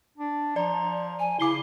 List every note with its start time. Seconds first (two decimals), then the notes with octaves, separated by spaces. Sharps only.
0.17 D4
0.56 F3 D5 A#5
1.19 G#5
1.40 C#3 E4 D6 C7 G7